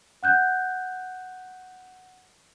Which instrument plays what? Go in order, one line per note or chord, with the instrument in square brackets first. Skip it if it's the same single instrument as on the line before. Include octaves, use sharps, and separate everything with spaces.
[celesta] F#5 F#6 G6